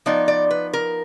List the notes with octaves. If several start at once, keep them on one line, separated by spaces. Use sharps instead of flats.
F3 B3 D#4 D5
D5
B4
A#4